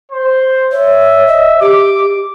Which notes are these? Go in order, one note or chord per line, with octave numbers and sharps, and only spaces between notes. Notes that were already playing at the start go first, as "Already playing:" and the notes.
C5
C#5 E5
D#5
G4 D6